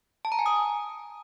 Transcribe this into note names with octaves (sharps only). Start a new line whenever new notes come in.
A5
A#5
G#5
D#6